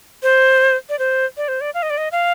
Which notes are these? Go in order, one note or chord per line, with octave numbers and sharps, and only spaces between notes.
C5
D5
C5
D5
C5
D5
F5
D#5
D5
D#5
F5